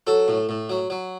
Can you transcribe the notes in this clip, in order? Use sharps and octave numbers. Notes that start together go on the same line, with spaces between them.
F#3 A4
A2
A2
F#3
F#3